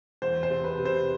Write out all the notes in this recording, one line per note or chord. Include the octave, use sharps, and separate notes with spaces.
E2 C5
C5
C3
B4
C3
C5